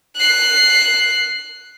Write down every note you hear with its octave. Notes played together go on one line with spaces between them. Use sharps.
F#6 C7